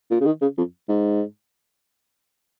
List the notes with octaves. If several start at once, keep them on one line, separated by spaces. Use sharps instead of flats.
A#2
C#3
D#3
C#3
F2
G#2